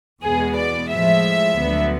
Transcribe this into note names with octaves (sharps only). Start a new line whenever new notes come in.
E2 B2 G#3 B3 G#4
D5
A2 F3 G#3 E5
D2 D3 F#3 B3